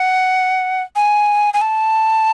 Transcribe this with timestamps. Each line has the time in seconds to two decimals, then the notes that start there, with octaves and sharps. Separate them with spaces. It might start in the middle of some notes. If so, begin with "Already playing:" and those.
Already playing: F#5
0.96 G#5
1.54 G#5
1.61 A5